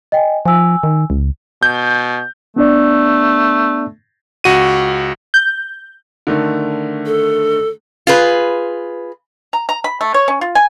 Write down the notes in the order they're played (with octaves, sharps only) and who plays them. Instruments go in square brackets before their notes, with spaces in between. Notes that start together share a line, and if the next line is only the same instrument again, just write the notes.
[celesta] D#5 G5 G#5
[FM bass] F3 [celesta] G#5 E6
[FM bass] D#3
C#2
[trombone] B2 [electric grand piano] G6
[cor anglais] A3 [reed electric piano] B3 D4 D5
[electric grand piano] C#2 F#4 D#7
[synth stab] G6
[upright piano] D3 D#3 A3
[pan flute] A4
[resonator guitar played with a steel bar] F4 G#4 B4
[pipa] A#5
A#5
B5
A3
C#5
C#4
F4
G#5